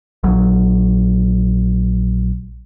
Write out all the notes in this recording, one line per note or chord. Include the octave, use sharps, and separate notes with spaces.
A#1 F#3